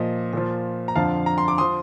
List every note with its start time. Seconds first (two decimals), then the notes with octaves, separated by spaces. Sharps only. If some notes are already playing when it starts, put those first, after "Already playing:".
Already playing: A#2 F3 D#5
0.33 A#2 F3
0.88 A#5
0.96 F2 D3 F3 F5 A5
1.26 A#5
1.38 C6
1.48 D6
1.58 F3 C6 D#6